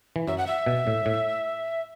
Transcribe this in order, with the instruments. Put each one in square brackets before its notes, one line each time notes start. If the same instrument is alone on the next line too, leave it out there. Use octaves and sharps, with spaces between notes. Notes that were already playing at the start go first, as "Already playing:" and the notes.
[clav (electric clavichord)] E3
[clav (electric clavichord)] F#2 F#3 [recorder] E5
[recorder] F#5
E5
[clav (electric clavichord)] B2
A2
A2